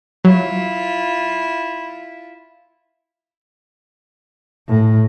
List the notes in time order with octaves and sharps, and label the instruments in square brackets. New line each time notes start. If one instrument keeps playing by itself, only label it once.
[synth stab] F#3 [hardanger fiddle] E4 F4
[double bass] A2